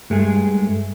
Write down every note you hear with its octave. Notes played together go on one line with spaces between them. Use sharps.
G2 G#3 A3 G#4